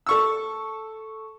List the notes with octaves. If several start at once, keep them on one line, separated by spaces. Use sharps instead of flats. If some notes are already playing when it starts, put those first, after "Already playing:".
A4 C#6 E6